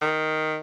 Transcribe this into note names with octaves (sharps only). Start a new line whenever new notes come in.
D#3